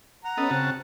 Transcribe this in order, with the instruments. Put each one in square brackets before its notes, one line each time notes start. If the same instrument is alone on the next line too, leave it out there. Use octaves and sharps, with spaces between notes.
[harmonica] F#5 A#5
[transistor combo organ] B3 A4 D#5 [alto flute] C#4
[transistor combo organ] C#3 F#4 A5 [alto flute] C4